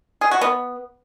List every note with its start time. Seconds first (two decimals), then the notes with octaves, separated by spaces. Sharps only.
0.21 G#4
0.31 F#4
0.41 B3